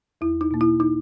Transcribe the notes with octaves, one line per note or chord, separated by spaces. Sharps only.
E2 E4
D#4
B2 A#3
E4
D#4